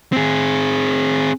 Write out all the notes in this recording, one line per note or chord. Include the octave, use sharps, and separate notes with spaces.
C4 G#4